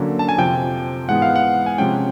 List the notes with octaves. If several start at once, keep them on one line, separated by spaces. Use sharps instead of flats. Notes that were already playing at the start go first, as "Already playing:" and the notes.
Already playing: D3 F#3 A#3 C#4
A5
G#5
F2 C3 F3 G5
G#2 E3 G#3 B3 F#5
F5
F#5
G#5
C3 F3 G#3 C#4 G5